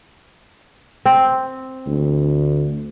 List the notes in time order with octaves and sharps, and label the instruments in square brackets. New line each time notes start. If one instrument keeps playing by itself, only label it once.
[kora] C4
[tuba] D2